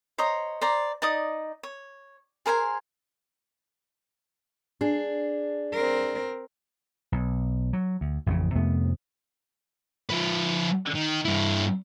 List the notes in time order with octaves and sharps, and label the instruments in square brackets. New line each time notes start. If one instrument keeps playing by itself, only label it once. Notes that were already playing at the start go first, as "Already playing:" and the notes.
[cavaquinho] C5 C#5 D#5 A#5
C5 D5 A#5
D#4 D5 D#5 D#6
C#5
G#4 A#4 C5 G#5
[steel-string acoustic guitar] D4 G#4
[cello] C4 A#4
[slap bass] B1
F#3
D2
A1 F2 A2 C#3
F2 C3 A3 B3
[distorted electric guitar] F3 B4
D#3
G2 E4